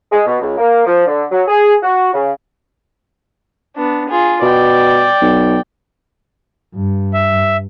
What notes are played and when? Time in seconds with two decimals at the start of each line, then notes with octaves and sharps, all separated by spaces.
0.11 G#3
0.26 B2
0.41 C#2
0.57 A#3
0.86 F3
1.07 D3
1.31 F#3
1.48 G#4
1.82 F#4
2.14 C#3
3.76 B3 D4
4.09 F4 G#4
4.42 B2 D5 G5
5.22 B1
6.75 G2
7.14 E5